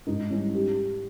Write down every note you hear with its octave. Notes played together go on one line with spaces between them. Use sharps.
G#2 D#4
E3 G3 C#4
G4